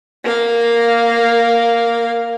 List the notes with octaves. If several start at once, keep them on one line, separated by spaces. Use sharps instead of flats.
A#3 F5